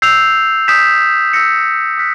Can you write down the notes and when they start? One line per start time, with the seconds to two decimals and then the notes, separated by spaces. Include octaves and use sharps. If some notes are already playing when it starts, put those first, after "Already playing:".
0.02 E6 G6 C7 F7
0.68 D#6 G6 B6 E7
1.33 E6 G6 A#6 C#7
1.98 D#6 F#6 B6